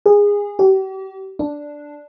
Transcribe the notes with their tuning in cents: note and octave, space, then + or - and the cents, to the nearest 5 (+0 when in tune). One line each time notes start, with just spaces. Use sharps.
G#4 -20
G4 -40
D4 +0